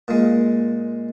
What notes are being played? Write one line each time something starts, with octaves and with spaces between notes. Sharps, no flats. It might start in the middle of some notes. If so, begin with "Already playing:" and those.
A#2 G#3